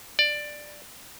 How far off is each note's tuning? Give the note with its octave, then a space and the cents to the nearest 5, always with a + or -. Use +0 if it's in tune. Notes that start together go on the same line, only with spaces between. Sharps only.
D5 +10